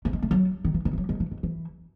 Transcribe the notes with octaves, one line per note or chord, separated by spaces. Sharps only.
A3
G#3
A3
F#3
D#3
E3
D#3
E3
F#3
G#3
E3
D#3
E3